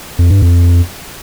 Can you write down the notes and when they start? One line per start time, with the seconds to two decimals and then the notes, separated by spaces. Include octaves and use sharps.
0.19 F2
0.30 G2
0.42 F2